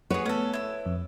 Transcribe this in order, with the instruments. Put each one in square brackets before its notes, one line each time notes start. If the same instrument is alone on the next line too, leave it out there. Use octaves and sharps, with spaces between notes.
[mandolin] F#4 G#4 [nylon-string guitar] B4 C#5
[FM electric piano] A3 B3 [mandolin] C#4 A4
[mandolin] E4 E6
[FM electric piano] F2